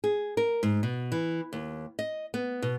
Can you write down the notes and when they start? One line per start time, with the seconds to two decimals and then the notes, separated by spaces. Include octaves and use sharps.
0.04 G#4
0.37 A#4
0.63 G#2
0.83 B2
1.12 E3
1.53 D#2
1.99 D#5
2.34 B3
2.62 B2